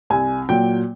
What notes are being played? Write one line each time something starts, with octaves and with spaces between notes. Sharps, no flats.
C2 G#5
A#2 F#3 G5